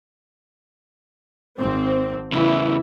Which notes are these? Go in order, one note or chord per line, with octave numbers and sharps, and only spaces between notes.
G#1 C4
E2 C#3 E3 E4